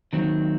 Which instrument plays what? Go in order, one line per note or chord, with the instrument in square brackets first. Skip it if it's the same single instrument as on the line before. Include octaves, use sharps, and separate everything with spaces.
[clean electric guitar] D#2 D#3 F#3 C4